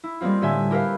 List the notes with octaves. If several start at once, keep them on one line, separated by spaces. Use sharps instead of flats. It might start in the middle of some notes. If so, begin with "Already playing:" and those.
E4
G3 G#3 A#3 C4 F4
A2 D3 G4 E5 G#5
E4 G4 A#4 B4 F5